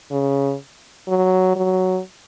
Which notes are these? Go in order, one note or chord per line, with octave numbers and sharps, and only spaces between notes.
C#3
F#3
F#3